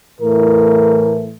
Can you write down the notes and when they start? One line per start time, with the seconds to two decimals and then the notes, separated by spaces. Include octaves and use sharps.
0.20 A2 E3 A3 A#4